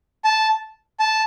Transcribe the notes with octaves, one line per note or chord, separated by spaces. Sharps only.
A5
A5